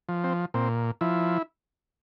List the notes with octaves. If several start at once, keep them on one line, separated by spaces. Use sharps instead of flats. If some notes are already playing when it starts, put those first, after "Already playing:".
F3
C4
A#2 C4
F3 E4